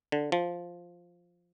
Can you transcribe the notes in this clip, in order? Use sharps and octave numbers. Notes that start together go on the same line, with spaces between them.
D3
F3